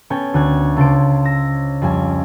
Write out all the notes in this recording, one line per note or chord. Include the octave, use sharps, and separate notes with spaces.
B3 C#4 A4 G5 G#5
D2 F#6 G#6
C#2 A4 C5 D7
E6 A#6
F2 G3 C#4 G#5